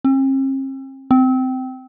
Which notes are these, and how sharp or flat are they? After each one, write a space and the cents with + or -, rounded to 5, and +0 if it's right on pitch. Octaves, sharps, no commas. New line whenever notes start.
C4 +45
C4 -20